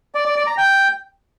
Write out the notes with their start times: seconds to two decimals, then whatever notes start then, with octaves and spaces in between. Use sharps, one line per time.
0.15 D5
0.25 D5
0.36 D5
0.47 A#5
0.58 G5